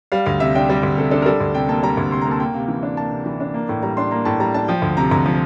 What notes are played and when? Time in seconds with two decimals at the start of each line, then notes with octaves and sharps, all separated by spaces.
0.12 G3 F5
0.26 D2 F5
0.40 C3 E5
0.55 D4 G5
0.69 G3
0.83 D2
0.98 C3 A4
1.11 D4 A4
1.22 A#4
1.26 G3 A4
1.40 D2
1.54 C3 G5
1.69 A#3 A5
1.83 G3 A#5
1.97 D2
2.12 C3 C6
2.21 A#5
2.26 A#3
2.31 A5
2.40 A#3 G5
2.54 C3 F5
2.68 E3
2.83 D4
2.97 A#3 A5
3.12 C3
3.26 E3
3.40 D4
3.54 A#3
3.69 A2
3.82 G3 A#5
3.97 D4 C6
4.11 A#3 A#5
4.25 A2 A5
4.40 G3 A#5
4.54 D4 A5
4.68 F3 G5
4.82 D2
4.97 C3 A#5
5.11 D2 A#5
5.26 F3